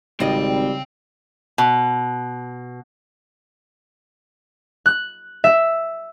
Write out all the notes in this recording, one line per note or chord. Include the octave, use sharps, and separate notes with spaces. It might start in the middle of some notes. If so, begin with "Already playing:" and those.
G#1 C#3 G3 C4 D5 D#5 G5
B2
F#6
E5